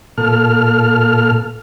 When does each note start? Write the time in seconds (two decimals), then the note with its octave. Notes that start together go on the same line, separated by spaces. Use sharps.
0.18 A#2 A4 F6